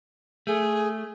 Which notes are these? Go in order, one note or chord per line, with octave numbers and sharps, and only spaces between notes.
A3 G#4